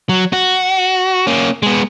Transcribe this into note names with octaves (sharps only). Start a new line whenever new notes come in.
F#3
F#4
A#3 C#4
G#3 B3